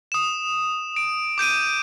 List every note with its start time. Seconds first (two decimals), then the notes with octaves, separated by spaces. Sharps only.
0.12 D#6 E7
0.96 D7
1.38 D6 G6 D7 D#7